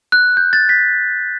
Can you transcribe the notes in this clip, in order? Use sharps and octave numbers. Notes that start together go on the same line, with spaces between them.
F#6
G6
A6
B6